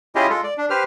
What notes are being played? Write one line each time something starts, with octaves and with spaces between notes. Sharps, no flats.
C#4 E4 F4 G4 G#4 D#5
G#3 F4 A4
D5
D4
G4 B4 C5 F6